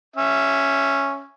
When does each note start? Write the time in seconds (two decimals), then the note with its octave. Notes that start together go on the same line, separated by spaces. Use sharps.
0.16 C#4 E5